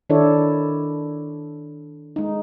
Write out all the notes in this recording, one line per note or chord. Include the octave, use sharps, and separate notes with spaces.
D#3 D4 E4 A4 C#5 D5
G#3 D#4